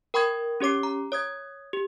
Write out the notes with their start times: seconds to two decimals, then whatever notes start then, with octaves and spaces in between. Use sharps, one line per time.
0.14 A#4 G5 B5 C#6 D#6 G#6
0.60 C#4 G4 C#5 D6 C7
0.83 A#5
1.12 C#5 D#6 G#6
1.73 G4